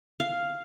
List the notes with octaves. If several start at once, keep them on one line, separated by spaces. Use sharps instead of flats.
F5